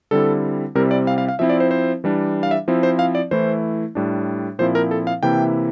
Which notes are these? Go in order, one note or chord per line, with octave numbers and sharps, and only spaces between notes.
D3 G3 C4 E4 A4
C3 G3 C4 E4 A#4
D5
F5
F5
F5
F3 C4 E4 E5
D5
C5
C5
E3 G3 D4
F5
E5
F3 C4 E4
C5
F5
D5
E3 A3 E4 C5
A2 G3 D4
A#2 F3 C4 E4 C5
A#4
A4
F5
C3 E3 A#3 E4 G5